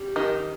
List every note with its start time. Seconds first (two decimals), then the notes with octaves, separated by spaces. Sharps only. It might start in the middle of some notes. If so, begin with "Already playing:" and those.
Already playing: G3 C4 G4
0.16 D#3 D#4